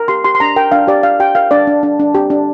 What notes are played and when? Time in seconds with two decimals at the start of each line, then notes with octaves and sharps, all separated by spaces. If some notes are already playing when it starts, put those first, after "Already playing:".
Already playing: A#4
0.08 G4 C6
0.24 G4 C6
0.35 C6
0.40 D4 A#5
0.56 A#4 G5
0.72 D4 F5
0.87 G4 D5
1.03 G4 F5
1.20 G4 G5
1.35 A#4 F5
1.51 D4 D5
1.67 D4
1.83 D4
2.00 D4
2.15 G4
2.30 D4